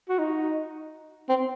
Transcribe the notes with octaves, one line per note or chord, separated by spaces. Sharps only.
F#4
D#4
C4